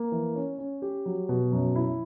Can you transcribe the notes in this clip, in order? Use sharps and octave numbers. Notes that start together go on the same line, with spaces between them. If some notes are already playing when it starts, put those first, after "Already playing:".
Already playing: A#3
E3
C#4
C#4
G4
F#3
B2
F#2
E4